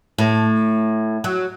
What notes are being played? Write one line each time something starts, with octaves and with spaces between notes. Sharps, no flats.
A2
F#3